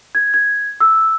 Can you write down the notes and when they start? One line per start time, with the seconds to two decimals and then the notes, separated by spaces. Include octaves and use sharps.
0.15 G#6
0.34 G#6
0.81 E6